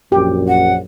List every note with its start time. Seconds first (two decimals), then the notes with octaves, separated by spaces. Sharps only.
0.12 A#1 F#2 G4
0.48 F#5